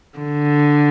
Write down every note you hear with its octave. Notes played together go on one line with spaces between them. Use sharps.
D3